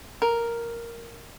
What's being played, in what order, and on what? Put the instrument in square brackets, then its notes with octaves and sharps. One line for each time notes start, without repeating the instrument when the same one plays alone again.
[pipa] A#4